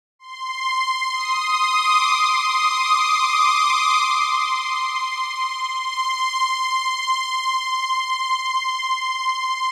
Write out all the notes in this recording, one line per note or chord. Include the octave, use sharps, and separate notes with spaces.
C6
D#6
D#6
D6
C6
D#6
D6
D6
D6
D6
C6
C6